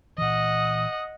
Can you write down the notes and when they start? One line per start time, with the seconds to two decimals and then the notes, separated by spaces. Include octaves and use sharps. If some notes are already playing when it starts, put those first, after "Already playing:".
0.18 A#2 E3 D#5 F#5 D#6